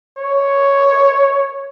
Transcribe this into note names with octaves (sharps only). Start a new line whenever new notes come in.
C#5